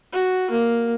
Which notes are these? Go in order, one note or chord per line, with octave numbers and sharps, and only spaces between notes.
F#4
A#3